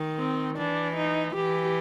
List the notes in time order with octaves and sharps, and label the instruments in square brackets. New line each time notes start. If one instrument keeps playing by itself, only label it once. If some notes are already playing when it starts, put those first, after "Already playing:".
Already playing: [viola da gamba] D#3
[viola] C4
[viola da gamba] E3 [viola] D4
[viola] D#4
[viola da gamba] E3 [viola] G4